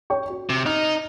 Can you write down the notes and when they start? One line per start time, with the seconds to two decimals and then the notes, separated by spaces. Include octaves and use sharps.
0.10 C#5 G5 C#6
0.30 F#4
0.50 C3
0.66 D#4 F6